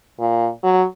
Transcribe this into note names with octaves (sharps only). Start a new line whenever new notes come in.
A#2
F#3